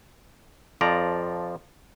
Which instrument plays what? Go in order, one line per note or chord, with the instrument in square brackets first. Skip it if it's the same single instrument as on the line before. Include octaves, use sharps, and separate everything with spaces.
[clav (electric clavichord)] F2 F3 D5 A#5